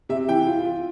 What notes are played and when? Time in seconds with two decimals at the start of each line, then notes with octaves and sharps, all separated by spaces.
0.09 C3 E5
0.28 E3 G5
0.47 F4
0.65 F4